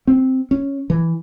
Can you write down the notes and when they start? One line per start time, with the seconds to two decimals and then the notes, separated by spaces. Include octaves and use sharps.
0.07 C4
0.51 C#4
0.90 E3